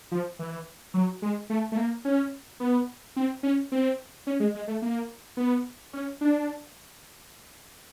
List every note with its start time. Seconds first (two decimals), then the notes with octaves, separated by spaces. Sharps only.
0.12 F3
0.39 E3
0.94 F#3
1.22 G#3
1.50 A3
1.72 A3
1.77 A#3
2.05 C#4
2.60 B3
3.16 C4
3.43 C#4
3.72 C4
4.27 C#4
4.40 G#3
4.55 G#3
4.67 A3
4.82 A#3
5.37 B3
5.93 C#4
6.21 D4